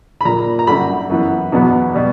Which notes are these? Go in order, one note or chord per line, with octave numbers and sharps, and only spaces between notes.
B5
A#2 A#3 A#5
A#5
F#2 D3 G3 B5
F#2 E3 B3
E2 B2 F#3 B3
B2 G3